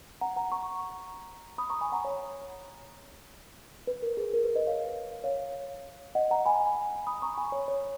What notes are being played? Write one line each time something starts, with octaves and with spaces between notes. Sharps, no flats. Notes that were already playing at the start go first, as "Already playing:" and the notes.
F#5 A#5
F#5 A#5
A#5 C#6
B5 D#6
A#5 C#6
G#5 B5
F#5 A#5
C#5
B4
A#4
G#4
A#4
B4
B4 D#5
C#5 F5
C#5 F5
D#5 F#5
F#5 A#5
G#5 B5
B5 D#6
A#5 C#6
G#5 B5
C#5
C#5